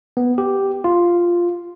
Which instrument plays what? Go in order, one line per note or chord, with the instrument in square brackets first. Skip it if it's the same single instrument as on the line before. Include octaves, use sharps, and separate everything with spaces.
[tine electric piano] B3
G4
F4